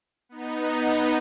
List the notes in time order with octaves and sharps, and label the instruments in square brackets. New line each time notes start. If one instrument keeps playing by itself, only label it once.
[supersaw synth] B3 D#4